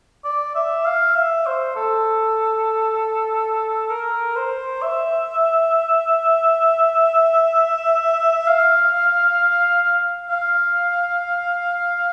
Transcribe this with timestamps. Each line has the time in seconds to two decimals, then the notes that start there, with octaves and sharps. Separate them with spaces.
0.24 D5
0.55 E5
0.85 F5
1.15 E5
1.46 C5
1.76 A4
3.90 A#4
4.36 C5
4.82 E5
8.47 F5
10.29 F5